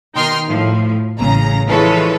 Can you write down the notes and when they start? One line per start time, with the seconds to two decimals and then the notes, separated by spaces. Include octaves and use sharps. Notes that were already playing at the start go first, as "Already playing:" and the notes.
0.15 B2 D#3 D#4 G5 C6 F6
0.47 A2 F3
1.18 A1 C#3 A#5
1.67 E3 F3 G#3 A4 B4 C#5